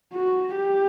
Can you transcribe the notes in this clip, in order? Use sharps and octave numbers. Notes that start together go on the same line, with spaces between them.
F#4
G4